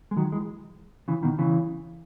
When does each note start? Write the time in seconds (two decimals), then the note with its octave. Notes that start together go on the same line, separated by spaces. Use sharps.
0.11 G#3
0.17 D#3 F#3
0.32 E3 G#3
1.08 C#3 E3
1.23 B2 D#3
1.39 C#3 E3